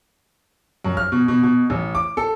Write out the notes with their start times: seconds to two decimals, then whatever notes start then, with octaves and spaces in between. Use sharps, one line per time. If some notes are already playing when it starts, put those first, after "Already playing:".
0.85 F#2
0.97 F6
1.12 B2
1.28 B2
1.43 B2
1.70 A1
1.95 D6
2.17 A4